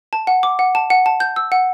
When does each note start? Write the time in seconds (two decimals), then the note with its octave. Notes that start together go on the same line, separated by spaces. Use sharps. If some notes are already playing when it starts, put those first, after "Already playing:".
0.13 A5
0.27 F#5
0.43 D6
0.59 F#5
0.75 A5
0.90 F#5
1.06 A5
1.20 G6
1.36 E6
1.52 F#5